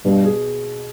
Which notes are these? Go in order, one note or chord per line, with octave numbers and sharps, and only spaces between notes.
G2 B2
G#4